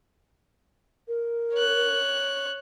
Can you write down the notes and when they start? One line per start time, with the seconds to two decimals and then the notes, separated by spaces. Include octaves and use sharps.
1.08 A#4
1.54 C#5 F#6